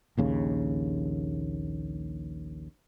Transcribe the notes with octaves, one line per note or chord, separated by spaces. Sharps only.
A#1 D#2 C#3